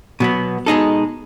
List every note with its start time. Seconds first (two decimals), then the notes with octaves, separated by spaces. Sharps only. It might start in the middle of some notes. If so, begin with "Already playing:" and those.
0.20 B2 F#3 B3
0.66 B2 G#3 D#4 A4